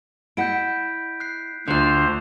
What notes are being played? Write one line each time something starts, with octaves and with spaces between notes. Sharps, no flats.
E4 D#5 F#5 G6 B6 D7
F#6 C7
D2 D3 D4 F4 C5 F#6 F7